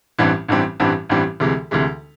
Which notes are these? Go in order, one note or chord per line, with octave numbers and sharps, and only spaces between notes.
A1 G2 E3 G3 C4
A1 G2 E3 G3 C4
A1 G2 E3 G3 C4
A1 G2 E3 G3 C4
D2 C3 E3 G#3
D2 C3 E3 G#3